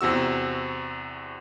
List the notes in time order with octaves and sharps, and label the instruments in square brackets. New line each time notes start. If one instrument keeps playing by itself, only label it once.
[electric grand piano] E2 C3 F#4 E6